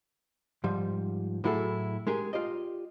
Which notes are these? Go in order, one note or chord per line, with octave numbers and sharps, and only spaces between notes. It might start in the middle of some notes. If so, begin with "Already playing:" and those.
G#2 F3 G3
A2 F#3 E4 F#4 G#4 A4
G#3 G4 G#4 A#4
F4 G4 D5 D#5